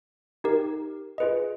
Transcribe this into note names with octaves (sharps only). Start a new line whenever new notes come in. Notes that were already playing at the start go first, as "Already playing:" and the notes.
D#4 G4 A#4
F4 G#4 B4 D#5